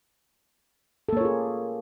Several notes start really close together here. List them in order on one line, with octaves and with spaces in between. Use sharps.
A4 A#3 C#5 F4 G#4